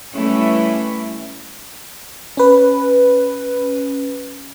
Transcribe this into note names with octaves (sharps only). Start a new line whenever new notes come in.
E3 G3 A3 C#4 E4
C#4 B4